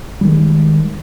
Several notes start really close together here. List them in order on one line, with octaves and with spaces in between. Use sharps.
G3 D#3 G#3